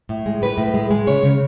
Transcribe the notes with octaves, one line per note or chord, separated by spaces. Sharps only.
A2
G#3
A2 B4
A2
G#3
G#3
C#3 C#5
C#3